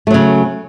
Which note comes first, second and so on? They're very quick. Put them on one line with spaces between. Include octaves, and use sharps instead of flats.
A3 F#3 C#3